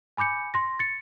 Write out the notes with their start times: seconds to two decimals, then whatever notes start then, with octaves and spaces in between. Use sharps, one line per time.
0.17 G#5 B5 D6 G6 C#7
0.54 C6 A#6
0.79 A6 C#7